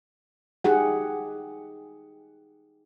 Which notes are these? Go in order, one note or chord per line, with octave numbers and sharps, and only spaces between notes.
D#4 G4 G#4 F#5